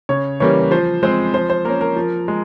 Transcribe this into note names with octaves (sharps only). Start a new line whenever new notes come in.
C#3 C#5
E3 G3 A#3 C#4 C#5
F3 C5
G#3 C4 C5
F3 C5
C5
A#3 C#4 A#4
A#4
F3
G#3